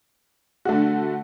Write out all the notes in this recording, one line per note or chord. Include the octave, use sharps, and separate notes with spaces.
D3 A3 F#4